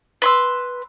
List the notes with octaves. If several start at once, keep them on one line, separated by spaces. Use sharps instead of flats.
B4 C6 E6